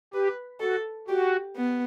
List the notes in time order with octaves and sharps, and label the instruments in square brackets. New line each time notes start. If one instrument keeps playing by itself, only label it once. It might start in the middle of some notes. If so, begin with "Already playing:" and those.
[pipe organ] G4 [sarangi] B4
[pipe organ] F#4 [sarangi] A4
[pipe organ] F#4 [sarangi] G4
[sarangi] B3